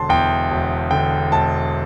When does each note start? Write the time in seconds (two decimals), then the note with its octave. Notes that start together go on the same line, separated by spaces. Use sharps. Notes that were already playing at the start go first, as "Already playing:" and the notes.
Already playing: E1 D3 A5 C6
0.09 E2 G5
0.51 E1
0.91 D3 G5
1.32 E1 A5